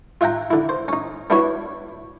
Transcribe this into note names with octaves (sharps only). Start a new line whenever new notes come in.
F4 E5 F#5 G5 A#5
D3 E4
C5
C#4 D#4
B3 D4 E4 F#4 B4 C#5